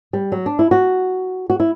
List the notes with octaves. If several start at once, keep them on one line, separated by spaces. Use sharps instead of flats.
G3
F#3
D4
E4
F#4
F#4
E4